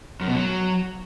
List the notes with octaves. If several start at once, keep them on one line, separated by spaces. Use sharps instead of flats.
F#2
B2
F#3